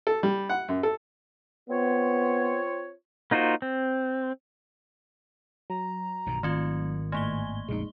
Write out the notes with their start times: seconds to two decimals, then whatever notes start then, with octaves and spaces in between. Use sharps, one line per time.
0.07 A4
0.23 G3
0.49 F#5
0.68 F#2
0.83 A4
1.70 B3 C4 F4 C#5
3.31 A#3 D#4 F4 F#4 C5
3.62 C4
5.70 F#3 A#5
6.26 B1 G2 D#3
6.43 G#1 D#3 A3 C4 F4
7.12 A2 A3 A#3 G#5 G#6 G7
7.68 A#1 F2 C#3 G#3 D#4